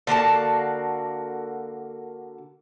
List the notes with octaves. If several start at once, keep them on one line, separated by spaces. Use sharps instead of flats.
D3 A#3 F#4 A5